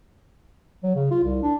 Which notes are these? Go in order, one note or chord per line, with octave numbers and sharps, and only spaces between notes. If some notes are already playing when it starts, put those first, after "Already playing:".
F#3
C#3
F4
C2
D4